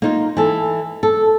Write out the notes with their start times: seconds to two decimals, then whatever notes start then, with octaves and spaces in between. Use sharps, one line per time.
0.02 A#3 D#4 F4
0.37 E3 A4
1.03 A4